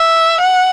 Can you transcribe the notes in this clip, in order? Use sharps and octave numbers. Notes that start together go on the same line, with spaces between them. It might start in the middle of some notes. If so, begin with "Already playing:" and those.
Already playing: E5
F#5